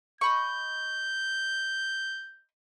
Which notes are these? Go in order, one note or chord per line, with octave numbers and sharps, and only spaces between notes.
D#5 B5 C#6 G6